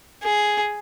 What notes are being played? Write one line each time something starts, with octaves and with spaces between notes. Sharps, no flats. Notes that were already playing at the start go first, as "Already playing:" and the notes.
G#4